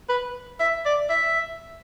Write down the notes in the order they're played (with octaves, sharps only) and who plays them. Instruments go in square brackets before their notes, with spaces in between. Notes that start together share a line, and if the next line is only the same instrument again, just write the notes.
[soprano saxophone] B4
E5
D5
E5